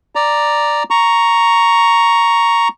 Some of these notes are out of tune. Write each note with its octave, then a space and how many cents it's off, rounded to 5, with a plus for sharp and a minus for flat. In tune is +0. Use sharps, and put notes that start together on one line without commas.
D5 +0 A#5 +0
A#5 +0 C#6 +5